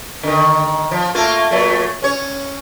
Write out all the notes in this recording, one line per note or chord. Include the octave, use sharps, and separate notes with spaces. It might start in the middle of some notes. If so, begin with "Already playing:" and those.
D3 D#3
F3
A3 A#3 F4
A#2 F#3 A3
C#4 C#5